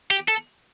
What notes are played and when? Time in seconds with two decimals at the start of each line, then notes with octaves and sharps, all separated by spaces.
0.11 G4
0.28 A4